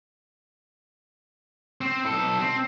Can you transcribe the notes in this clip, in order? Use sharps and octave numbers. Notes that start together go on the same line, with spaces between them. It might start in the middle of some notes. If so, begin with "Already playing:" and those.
C4
B1 A4
C4